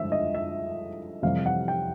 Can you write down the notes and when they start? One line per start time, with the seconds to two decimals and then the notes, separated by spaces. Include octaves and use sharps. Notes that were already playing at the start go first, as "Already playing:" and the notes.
Already playing: G2 D3 F3 G#3 E5
0.12 D#5
0.35 E5
1.22 F2 C3 E3 G3 F5
1.46 F#5
1.68 G5